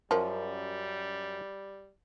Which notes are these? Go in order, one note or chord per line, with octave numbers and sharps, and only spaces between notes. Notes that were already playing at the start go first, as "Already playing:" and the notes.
F#2 F3 G3 A#4